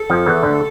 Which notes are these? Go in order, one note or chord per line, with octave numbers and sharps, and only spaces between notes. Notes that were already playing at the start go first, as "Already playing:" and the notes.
Already playing: A4
F2 F3
E2 E3
D2 D3